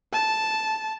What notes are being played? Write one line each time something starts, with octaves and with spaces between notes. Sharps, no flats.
A5